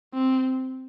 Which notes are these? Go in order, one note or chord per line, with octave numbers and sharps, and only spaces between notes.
C4